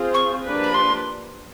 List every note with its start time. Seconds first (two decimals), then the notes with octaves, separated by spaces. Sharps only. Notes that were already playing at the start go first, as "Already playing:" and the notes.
Already playing: C4 F4 G#4 C5
0.14 C#6
0.44 F3 A#3 D4 G4 B4
0.63 B5
0.74 C6